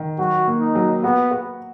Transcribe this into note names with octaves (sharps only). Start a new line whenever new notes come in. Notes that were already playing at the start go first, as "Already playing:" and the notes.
Already playing: D#3
F#3 F#4
A#3
D#4
F#3
B3 F#4
F#4